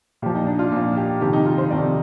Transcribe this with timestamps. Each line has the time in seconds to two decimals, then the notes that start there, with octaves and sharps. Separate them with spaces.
0.22 A#2 G4
0.26 F3
0.35 D#4
0.47 D4
0.59 F4
0.71 A#2 F3
0.96 G4
1.21 F2 C3 D#3 G4
1.33 D#4
1.46 F4
1.58 C5
1.70 F2 C3 D#3 D5